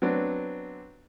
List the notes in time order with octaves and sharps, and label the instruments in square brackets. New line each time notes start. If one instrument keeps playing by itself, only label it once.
[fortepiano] F#3 B3 C4 D4